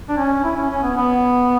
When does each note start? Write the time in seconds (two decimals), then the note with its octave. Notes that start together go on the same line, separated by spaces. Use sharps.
0.09 D4
0.17 C#4
0.44 E4
0.57 C#4
0.70 C#4
0.83 B3
0.97 B3